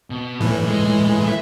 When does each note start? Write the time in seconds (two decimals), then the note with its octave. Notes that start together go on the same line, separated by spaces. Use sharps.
0.10 B2
0.40 E2 A2 E3
0.67 G#3
1.27 E5